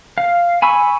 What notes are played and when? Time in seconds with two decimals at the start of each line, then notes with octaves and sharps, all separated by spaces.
0.18 F5
0.62 G#5 B5 C#6 E6